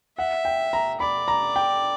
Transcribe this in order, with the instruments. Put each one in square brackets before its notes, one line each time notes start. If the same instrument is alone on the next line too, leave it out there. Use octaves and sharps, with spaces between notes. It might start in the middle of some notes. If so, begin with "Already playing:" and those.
[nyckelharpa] E5 [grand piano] F#5
[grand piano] G5
A#5
[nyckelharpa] D5 [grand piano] B5
[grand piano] A#5
G5